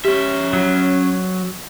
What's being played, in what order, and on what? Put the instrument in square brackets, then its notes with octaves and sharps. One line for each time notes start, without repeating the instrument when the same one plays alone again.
[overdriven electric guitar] C#4 E5 [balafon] G4
[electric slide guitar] F#3